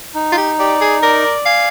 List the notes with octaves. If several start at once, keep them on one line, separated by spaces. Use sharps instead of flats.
D#4
F4
G4
G4 D5
G#4
A#4 D5
F5 G#5